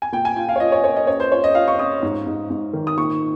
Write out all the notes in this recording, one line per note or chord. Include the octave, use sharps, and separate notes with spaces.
G#5
A#2 G5
G#5
F4 G5
F5
C#5
F4 D#5
C#5
A#3 C#5
D#5
C#4 C#5
C5
F4 C#5
D#5
F4 F5
C#6
C#4 D#6
G#2
G#2
G#2
D#3
D#6
A#2 C#6